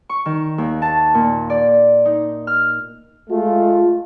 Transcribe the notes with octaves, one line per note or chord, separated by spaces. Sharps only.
C#6
D#3
D#2
A5
A#2
D5
D#4
F6
G#3 A3 F4